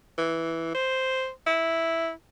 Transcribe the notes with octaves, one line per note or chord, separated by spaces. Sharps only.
E3
C5
E4